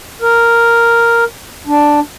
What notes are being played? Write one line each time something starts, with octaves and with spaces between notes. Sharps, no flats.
A#4
D4